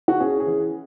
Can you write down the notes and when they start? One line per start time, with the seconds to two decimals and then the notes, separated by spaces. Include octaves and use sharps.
0.08 F#4
0.20 C#4 G#4
0.40 G#4
0.46 E3